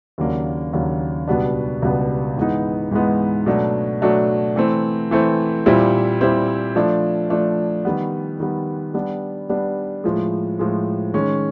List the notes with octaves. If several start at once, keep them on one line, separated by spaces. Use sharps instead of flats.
D#2 C#3 F#3 A#3 D4
D#2 C#3 F#3 A#3 D4
C#2 B2 G3 B3 D4
C#2 B2 G3 B3 D4
G#2 E3 G#3 B3 D#4
G#2 E3 G#3 B3 D#4
B2 F#3 A3 D4
B2 F#3 A3 D4
E3 A3 C4
E3 A3 C4
A#2 G3 C4 E4
A#2 G3 C4 E4
F3 A3 D4
F3 A3 D4
D#3 G3 B3
D#3 G3 B3
G3 B3 D4
G3 B3 D4
A2 F3 G#3
A2 F3 G#3
D#3 G#3 C#4